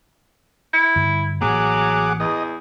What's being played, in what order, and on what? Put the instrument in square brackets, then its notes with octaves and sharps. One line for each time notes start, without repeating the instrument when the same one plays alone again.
[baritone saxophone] E4
[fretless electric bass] G2 D3
[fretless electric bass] A1 A2 A#3 [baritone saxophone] F#3 [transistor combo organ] G#4 F#5 D6
[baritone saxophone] E2 [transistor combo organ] D#5